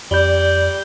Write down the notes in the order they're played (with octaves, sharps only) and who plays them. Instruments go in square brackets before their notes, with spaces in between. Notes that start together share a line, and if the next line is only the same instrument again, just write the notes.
[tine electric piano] F2 [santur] G3 [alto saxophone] D5 [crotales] G6 G7